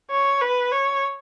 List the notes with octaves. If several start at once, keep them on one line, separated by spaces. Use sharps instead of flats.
C#5
B4
C#5